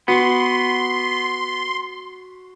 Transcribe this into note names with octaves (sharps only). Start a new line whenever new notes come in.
B3 F#4 C6